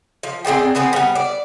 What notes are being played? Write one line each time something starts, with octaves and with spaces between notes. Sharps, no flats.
F3
C4 G#4 D5 G5
B3 C4 G#4 B4
G3 B3
D5